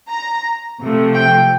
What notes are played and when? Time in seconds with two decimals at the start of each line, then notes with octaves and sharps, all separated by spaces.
0.10 A#5
0.80 C3 F3 A3
1.15 G5